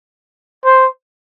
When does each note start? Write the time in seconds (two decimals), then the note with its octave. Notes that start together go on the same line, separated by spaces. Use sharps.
0.65 C5